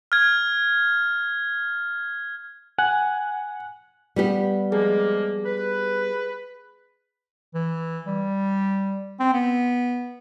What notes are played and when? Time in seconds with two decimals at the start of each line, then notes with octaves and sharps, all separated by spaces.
0.12 F6 G#6
2.79 F#5 G#5
4.16 G3 B3 G4
4.72 F3 G#3 A#3 G#4
5.46 B4
7.55 E3
8.07 G3
9.20 C4
9.33 B3